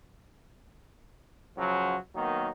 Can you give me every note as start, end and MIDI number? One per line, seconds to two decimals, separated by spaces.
1.57 1.96 42
1.57 1.96 49
1.57 1.96 53
1.57 1.96 54
2.15 2.48 51
2.15 2.48 54
2.15 2.48 58
2.15 2.48 59
2.15 2.48 63